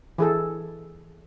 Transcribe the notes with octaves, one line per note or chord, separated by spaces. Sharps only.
E3 G#4 A4